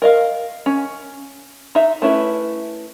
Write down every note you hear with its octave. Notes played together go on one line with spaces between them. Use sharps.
A#4 D#5 F5
C#4
D#4 E5
A3 C#4 E4 B4